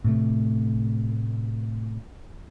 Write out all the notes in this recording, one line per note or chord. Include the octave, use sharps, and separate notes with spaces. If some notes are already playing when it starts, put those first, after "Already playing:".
A2 C3 A3